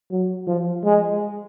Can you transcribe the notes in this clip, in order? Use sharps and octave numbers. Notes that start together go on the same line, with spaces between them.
F#3
F3
G#3